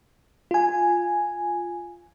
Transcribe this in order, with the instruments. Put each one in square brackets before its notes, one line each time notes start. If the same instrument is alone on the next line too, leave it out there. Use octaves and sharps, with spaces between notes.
[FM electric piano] F4 G#5